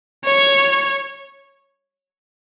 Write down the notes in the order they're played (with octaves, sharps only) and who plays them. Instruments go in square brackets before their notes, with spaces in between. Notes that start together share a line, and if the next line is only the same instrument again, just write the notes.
[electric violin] C#5